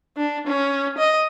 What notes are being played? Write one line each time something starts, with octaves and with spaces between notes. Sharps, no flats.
D4
C#4
D#5